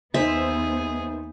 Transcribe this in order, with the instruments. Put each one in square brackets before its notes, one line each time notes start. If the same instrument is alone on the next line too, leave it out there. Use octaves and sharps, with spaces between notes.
[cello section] D#2 B3 [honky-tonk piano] D#4 C5 [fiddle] G#4 [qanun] E5